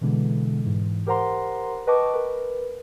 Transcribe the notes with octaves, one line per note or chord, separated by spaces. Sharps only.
B2 D3 E3 G#3
G#2 E3
G4 A#4 C5 F#5 A#5 C6
B4 D#5 G5 A5 C#6 D6
A#4 B4